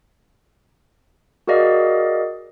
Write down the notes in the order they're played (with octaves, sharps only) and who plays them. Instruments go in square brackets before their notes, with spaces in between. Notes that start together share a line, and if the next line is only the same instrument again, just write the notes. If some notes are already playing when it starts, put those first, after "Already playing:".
[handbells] F#4 G#4 A#4 D5 D#5 F5